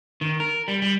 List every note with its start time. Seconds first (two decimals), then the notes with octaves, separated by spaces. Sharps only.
0.21 D#3
0.40 A#4
0.68 G3
0.82 G3